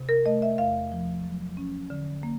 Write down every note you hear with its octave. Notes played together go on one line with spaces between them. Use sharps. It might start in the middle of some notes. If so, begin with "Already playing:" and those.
Already playing: C3
A#4
A3 D#5
E5
E2 F5
F3
F#3
C#4
D3
A#3